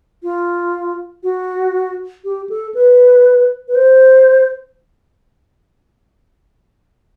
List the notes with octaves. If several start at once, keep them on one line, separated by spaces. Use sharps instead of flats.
F4
F#4
G4
A4
B4
B4
C5